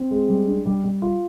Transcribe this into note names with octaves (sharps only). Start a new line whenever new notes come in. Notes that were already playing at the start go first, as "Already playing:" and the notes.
Already playing: C4
G#3
G3
D4
G3
G3
F4